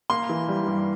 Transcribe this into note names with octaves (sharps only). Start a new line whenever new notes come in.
A#3 C6
E3
G3
G2